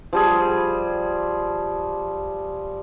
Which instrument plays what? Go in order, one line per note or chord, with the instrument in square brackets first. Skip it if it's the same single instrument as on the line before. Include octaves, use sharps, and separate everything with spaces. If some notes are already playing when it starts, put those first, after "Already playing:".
[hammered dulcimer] F3 G3 G#4